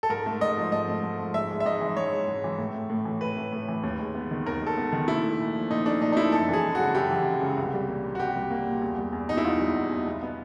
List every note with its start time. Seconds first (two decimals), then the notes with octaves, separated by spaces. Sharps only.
0.03 A4
0.09 G#2 A#4
0.26 A3
0.41 G#2 D#5
0.57 F3
0.72 G#2 D#5
0.88 A3
1.03 G#2
1.19 F3
1.34 G#2 E5
1.51 G#3
1.60 E5
1.65 G#2 D#5
1.81 E3
1.96 G#2 C#5
2.12 G#3
2.27 G#2
2.44 E3
2.59 A2
2.75 A3
2.90 A2
3.05 E3
3.21 A2 B4
3.37 A3
3.53 A2
3.68 E3
3.83 D#2
3.99 G#3
4.15 B3
4.31 D#3
4.46 D#2 A#4
4.61 G#3
4.67 A4
4.78 B3
4.93 D#3
5.08 A#2 E4
5.24 A3
5.39 A#2
5.55 F3
5.71 A#2 D#4
5.86 A3 D4
6.01 A#2 D#4
6.12 D#4
6.17 F3 E4
6.32 F#2 A4
6.49 E3 G#4
6.65 G#3
6.75 F#4
6.80 C#3
6.95 F#2 G4
7.11 E3
7.26 G#3
7.41 C#3
7.58 C2
7.74 G3
7.88 A#3
8.04 A#2
8.15 F#4
8.20 C2 G4
8.36 G3
8.51 A#3
8.67 A#2
8.82 E2
8.98 G3
9.13 E2
9.29 B2 D#4
9.37 E4
9.44 E2 F4
9.60 G3
9.76 E2
9.92 B2
10.06 B2
10.23 B3